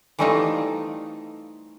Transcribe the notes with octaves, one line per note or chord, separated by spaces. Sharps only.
E3 G3 A3 C4 D#4 F4